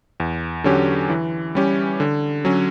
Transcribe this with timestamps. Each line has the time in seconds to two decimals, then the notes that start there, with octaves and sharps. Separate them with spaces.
0.20 E2
0.64 D3 F#3 C#4 G4
1.10 E3
1.55 G3 C#4 G4
2.00 D3
2.45 F#3 C#4